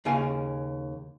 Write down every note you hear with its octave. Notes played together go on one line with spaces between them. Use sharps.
D#2 C#3 G#4 F5 G#5